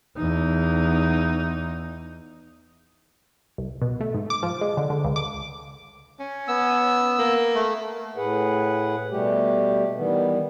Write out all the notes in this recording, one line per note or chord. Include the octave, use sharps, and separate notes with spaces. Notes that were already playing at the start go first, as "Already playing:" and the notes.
E2 D#4
C2
B2
A3
G#2
D6
F3
G#3
D3
D3
C#2
D6
C#4
B3 E6
A#3
A3
A2 G#4 B4 F#5
B2 G3 A3 G4
D#3 E3 G3 B3